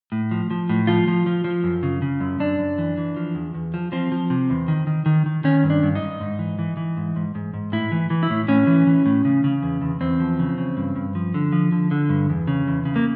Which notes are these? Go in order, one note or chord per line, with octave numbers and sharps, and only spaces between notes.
A2
F3
F3
A2
F3 F4
F3
F3
F3
F#2
C#3
C#3
F#2
F#2 D4
F#2
E3
E3
F3
E2
E2
F3
F3 C4
F3
C3
E2
D#3
D#3
D#3
D#3
D#3 C#4
G2
D4
G2
D#4
G2
G#2
E3
E3
E3
G#2
G#2
G#2
G#2
A2 E4
E3
E3
E4
A2
A2 C#4
E3
E3
A2
C#3
C#3
E2
E2
E2 C4
F3
C#3
C#3
G2
G2
F3
D3
F3
D3
D3
G2
E2
C#3
E2
C#3
A#3